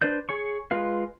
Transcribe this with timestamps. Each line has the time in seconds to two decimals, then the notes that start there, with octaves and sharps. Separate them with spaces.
0.02 D4 B4 C5 D5 G6
0.29 G#4 C#5 C#6
0.71 G#3 F4 B4 F5